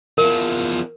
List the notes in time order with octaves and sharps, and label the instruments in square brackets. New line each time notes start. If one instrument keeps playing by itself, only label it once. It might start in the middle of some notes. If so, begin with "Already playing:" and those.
[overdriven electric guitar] E2 F3 [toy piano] A#4